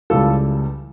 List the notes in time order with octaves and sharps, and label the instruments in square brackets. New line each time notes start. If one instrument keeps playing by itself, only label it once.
[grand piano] C#2 C#3 E3 G3 F4 A4